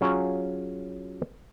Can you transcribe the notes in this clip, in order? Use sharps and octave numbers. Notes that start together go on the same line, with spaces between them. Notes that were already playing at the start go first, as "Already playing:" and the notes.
F#3 C#4 F4 G#4